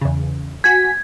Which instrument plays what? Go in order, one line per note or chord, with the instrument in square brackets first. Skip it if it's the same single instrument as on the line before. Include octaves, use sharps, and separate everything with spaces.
[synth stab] E2 C#3
[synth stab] F#4 G#5 B6 [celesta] G#6